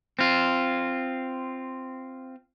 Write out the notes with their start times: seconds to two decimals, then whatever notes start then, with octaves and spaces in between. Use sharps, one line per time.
0.19 C4 F4